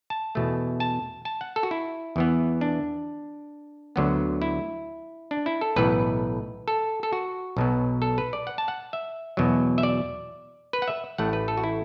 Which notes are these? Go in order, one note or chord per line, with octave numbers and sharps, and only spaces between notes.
A5
E2 B2 A3
A5
A5
F#5
A4
F#4
E4
E2 E3 B3
D4
D2 D3 F#3 B3
E4
D4
E4
A4
B1 A2 E3 B3 B4
A4
A4
F#4
B1 B2 F#3 B3
A4
B4
D5
F#5
A5
F#5
E5
E2 B2 F#3
E5
D5
B4
F#5
E5
A1 A2 A3 F#5
B4
A4
F#4
E4